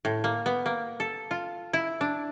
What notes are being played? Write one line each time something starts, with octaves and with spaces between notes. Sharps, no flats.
A2
A#3
B3
A#3
A4
F4
E4
D4